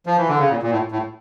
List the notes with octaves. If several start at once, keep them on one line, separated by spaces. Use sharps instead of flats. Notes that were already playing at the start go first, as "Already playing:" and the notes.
F3
E3
D3
C#3
A#2
A#2
A2
A2